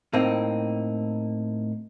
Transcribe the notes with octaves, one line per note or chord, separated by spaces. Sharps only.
A2 A#3 C4 D#4